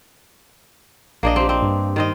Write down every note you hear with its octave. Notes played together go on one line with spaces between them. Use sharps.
A#1 A#3 D4 D#5
C4 G4
C4
G2
D#3 C4 D#5